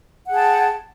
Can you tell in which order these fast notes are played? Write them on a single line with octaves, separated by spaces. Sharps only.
F#5 G#4 G5 A5